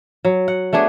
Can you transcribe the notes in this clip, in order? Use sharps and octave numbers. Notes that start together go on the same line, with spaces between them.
F#3
F#5
A3 B3 D4 G#4